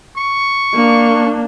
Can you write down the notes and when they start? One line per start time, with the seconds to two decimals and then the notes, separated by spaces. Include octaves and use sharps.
0.18 C#6
0.74 A#3 D4